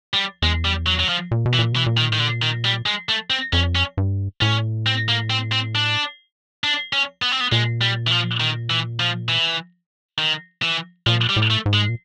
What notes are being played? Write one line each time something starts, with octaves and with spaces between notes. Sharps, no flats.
G3
E2 G#3
G3
F#3
F#3
F3
A#2
B2
E3
A#2
B2 E3
A#2
D#3
A2 D#3
A#2 D3
D#3
G3
G#3
A3
C4
F2 C#4
C#4
G2
A2 C#4
C4
A#3
C4
C4
D4
D4
C#4
B3
C4
B3
A#2 G#3
G3
E3
F3
D#3
E3
F3
E3
D#3
E3
A#2 F3
G3
A2
A3
G#2
G#3
A#2